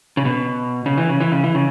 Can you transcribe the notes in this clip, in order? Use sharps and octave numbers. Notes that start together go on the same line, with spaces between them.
C#3
B2
C#3
E3
C#3
E3
C#3
E3
C#3